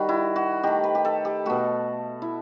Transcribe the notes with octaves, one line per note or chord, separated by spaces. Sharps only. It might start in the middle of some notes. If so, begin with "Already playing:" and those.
Already playing: D#3 G3 F#4
E4
F#4
D#3 A3 G4
B4
G4
A4
G4
B2 A3 F#4
E4